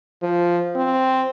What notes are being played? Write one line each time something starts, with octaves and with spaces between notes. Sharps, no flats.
F3
C4